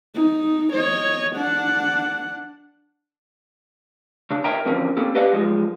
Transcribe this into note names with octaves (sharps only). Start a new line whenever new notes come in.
D#4
C#5 D#5
D4 F#5
C#3 D4
A#4 C#5 D#5 E5 G5 A#5
D3 E3 F3 C4 C#4 A#4
A#3 C4 C#4 A4
G4 B4 D5 D#5 F5 F#5
F#2 F3 G3 G#3